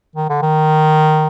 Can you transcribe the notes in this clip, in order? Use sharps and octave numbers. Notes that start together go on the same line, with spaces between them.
D#3
D3
D#3